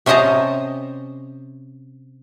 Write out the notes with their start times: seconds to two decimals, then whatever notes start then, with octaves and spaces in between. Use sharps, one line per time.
0.06 C3 C#4 C5 D#5 A5 A#5